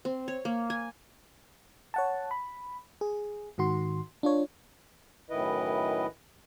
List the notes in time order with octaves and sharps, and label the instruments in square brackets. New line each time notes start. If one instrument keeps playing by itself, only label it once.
[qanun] C4
C#5
A#3
G#5
[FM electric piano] C#5 F#5 A5
B5
G#4
G#2 D#3 F#4 C6
D4 F4 C#5
[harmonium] F#2 A2 D#3 E4 B4 D#5